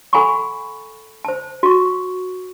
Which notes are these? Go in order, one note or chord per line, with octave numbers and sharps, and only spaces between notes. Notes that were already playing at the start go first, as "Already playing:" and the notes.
A4 F#5 G#5 A#5 B5 C#6
C5 A5
F#4 C#6